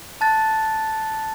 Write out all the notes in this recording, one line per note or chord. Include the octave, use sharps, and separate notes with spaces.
A5 F#6 A6